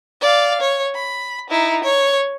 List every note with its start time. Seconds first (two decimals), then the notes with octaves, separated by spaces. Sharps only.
0.22 D5 F5
0.61 C#5
0.95 B5
1.50 D#4 E4
1.84 C#5